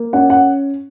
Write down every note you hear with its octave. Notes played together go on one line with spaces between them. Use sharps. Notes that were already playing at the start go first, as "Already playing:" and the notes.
Already playing: A#3
C#4 F#5
F#5